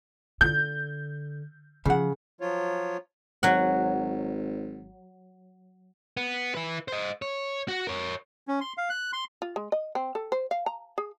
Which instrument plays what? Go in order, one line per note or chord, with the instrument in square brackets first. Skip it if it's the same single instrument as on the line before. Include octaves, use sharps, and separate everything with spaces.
[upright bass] D3 [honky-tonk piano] G6
[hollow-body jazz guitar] C#3 F#5 [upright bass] F3
[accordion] F3 F#3 F4 C#5
[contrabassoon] G#1 [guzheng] F#3 F#5
[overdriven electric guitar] B3
E4 B4
C5 D#5
C#5
F#4
A#4 C#5
[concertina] C#4
C6
F5
F#6
C6
[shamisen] F4
G#3
D#5
C4
A4
C5
F5
A#5
G#4